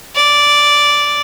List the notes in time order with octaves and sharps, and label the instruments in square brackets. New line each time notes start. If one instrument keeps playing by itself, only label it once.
[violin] D5